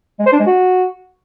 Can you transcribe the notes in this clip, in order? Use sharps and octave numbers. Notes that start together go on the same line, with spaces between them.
G#3
C5
D4
G#3
F#4